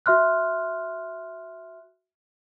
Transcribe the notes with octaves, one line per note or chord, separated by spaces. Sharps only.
F#4 E5 C6 F6 F#6